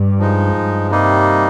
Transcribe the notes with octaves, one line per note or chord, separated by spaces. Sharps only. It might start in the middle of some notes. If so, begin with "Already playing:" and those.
Already playing: G2
F3 G#3 D#4
G2
C3 G3 A#3 D#4